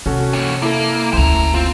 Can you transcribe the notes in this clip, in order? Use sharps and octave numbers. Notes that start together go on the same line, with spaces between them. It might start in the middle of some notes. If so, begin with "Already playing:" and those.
C3 C#4 F#4 A4
A#3 C#5
A#3 E4 A4
F#1 D2 C5 A#5
C4 F4